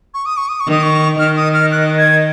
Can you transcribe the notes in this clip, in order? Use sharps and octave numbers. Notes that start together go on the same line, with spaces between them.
C#6
D#6
C#6
D#6
C#6
D#3 D#6
C#6
D#3 F6
D#6
F6
F#6
G#6